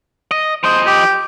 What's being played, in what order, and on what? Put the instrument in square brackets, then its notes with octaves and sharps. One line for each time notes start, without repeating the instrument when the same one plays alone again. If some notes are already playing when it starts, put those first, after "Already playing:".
[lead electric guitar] D#5
[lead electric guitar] F3 D#5 [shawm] C5
[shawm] G4